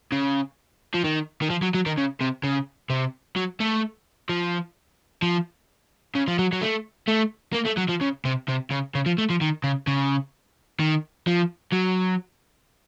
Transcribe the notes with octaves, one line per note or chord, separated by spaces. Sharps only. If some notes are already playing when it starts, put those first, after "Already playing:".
C#3
F3
D#3
D#3
F3
F#3
F#3
D#3
C#3
C3
C#3
C3
F#3
A3
F3
F3
C#3
F3
F#3
F#3
A3
A3
A#3
A3
F#3
F3
C#3
C3
C3
C#3
C#3
F3
A3
F3
D#3
C#3
C#3
D#3
F3
F#3